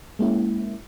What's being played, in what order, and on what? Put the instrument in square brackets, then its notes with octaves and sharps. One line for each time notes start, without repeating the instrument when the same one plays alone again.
[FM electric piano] G#3 A#3 C#4 E4